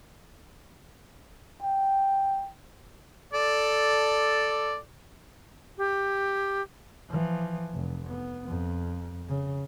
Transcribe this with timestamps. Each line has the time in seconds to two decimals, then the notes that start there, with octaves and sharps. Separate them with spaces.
1.63 G5
3.33 A4 D5
5.78 G4
7.09 E3 F3
7.73 F1
8.08 B3
8.48 F2
9.29 C#3